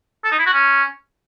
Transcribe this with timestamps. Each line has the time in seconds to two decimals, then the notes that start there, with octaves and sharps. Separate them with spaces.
0.24 A4
0.32 D#4
0.39 E4
0.46 F#4
0.54 C#4